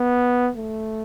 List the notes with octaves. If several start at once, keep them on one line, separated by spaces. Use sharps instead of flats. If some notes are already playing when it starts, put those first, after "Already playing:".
Already playing: B3
A3